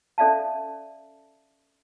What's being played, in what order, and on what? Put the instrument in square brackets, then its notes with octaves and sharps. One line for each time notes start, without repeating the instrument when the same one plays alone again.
[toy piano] C#4 A4 D5 E5 F5 A5